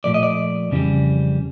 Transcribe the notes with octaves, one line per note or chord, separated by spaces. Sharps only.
A#2 F3 A3 D5
D#5
D5
F2 C#3 E3 G3